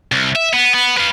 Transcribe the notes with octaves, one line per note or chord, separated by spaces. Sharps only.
C2
E5
B3
B3
B4 F5